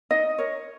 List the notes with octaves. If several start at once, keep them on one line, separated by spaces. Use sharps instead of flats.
D#4 D#5
A#4 C#5